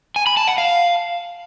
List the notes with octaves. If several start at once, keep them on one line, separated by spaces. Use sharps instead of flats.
G#5
B5
A5
F#5
F5